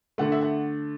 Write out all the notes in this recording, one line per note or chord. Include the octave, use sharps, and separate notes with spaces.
D3 A3 F#5
E5
F#5